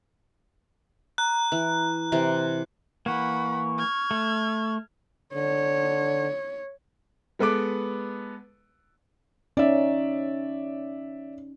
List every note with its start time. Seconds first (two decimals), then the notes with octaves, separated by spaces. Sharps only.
1.18 A#5 F#6
1.52 E3
2.12 C3 E3 G4
3.06 E3 A#3 F#5 B5 C#6
3.78 F6 G#6
4.11 A3
5.34 D3 C#5
7.39 G#3 B3 A4 B4 D6
9.57 C#4 D#4 D5 E5